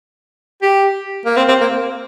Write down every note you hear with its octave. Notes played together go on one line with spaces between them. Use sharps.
G4
A#3
C4
C4
A#3